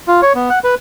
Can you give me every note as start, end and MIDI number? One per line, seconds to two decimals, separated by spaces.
0.08 0.21 65
0.22 0.33 73
0.35 0.50 59
0.50 0.59 78
0.64 0.75 71